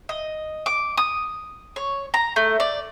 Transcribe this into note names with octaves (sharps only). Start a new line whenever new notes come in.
D#5
D6
D#6
C#5
A#5
A3
D5